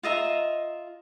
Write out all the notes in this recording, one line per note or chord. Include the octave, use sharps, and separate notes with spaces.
F4 D#5 E5 A#5